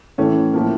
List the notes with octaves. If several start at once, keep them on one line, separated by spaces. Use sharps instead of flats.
A2 E3 A3 C#4
A2 F3 A#3